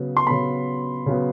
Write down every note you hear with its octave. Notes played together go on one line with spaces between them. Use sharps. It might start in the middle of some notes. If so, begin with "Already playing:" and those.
Already playing: C#3 F#3 B3
C6
C#3 F#3 B3 B5
C#3 F#3 B3